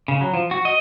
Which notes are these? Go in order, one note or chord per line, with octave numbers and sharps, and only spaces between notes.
C#3
F#3
F3
F#4
D#5